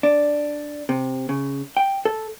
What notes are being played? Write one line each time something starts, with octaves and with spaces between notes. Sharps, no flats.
D4
C3
C#3
G5
A4